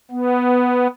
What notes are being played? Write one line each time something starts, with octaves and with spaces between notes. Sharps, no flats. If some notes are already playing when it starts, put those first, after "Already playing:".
B3